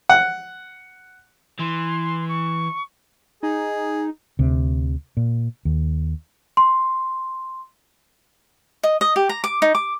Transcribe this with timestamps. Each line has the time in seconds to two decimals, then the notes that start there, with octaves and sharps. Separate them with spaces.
0.09 F#5
1.59 E3 C6
2.28 C#6
3.43 D#4 G#4
4.39 D2 C3
5.17 A#2
5.65 D#2
6.57 C6
8.83 D#5
9.01 D#5
9.16 G4
9.29 A#5
9.44 D6
9.62 D#4
9.75 D6